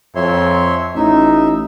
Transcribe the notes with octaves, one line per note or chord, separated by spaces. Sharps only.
F2 C#5 E5 C6
A1 D#4 E5